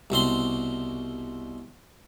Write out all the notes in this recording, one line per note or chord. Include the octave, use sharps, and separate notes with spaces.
C2 B2 C4 C6